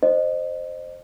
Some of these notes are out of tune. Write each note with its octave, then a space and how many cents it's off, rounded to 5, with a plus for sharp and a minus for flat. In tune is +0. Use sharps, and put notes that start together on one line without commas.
C5 +0 D#5 -25